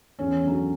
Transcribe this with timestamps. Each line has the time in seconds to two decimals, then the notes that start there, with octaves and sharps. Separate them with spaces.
0.19 E2 C#4
0.43 D3 F#3